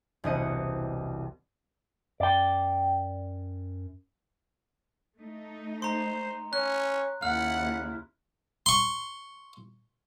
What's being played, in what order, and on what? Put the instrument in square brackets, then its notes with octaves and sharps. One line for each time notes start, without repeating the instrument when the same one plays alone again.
[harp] E1 C2 D#5 C#7
[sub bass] F#2 [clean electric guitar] D5 G5
[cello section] A3 D#4
[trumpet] C5 [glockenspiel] A#5 C6
[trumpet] C#4 [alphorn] C#5 [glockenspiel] F#6
[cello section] D#2 E4 [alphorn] C#3 [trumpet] F#5 [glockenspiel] F6
[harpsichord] C6 C#6